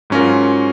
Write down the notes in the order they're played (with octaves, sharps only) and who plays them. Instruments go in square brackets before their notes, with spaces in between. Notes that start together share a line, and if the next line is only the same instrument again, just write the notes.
[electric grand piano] G#2 F#3 C#4 F4 A#4